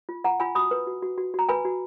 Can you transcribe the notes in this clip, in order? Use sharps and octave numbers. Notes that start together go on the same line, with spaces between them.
F4
F4 F#5 A#5
F4 G#5 B5
F#4 B5 D#6
B4
F#4
F#4
F#4
F#4 A#5
B4 G#5 B5
F#4